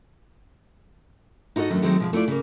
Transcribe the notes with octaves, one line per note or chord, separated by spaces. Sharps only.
D#4 E4 F#4 A4 D#5
F#2 D#3 F#3 A3 D4
D#3 F#3 G#3 A3 C4
B2 F3 G#3
A3 E4 F4 D5
C#3 A#3